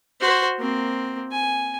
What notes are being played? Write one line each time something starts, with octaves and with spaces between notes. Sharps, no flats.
F#4 C5
A#3 C4
G#5